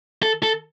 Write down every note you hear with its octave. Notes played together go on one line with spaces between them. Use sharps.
A4
A4